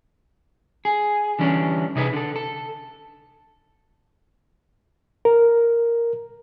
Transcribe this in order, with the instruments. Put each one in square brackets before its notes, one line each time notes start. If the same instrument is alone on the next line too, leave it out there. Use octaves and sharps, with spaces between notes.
[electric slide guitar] G#4
D3 E3 G3 C#4 D4
C3 D#4 G#4 B4
D3 A4
A4
[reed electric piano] A#4